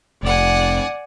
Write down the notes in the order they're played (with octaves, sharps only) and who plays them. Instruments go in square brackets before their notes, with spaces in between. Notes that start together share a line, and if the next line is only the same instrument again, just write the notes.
[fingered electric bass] F1 [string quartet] D5 F#5 G#5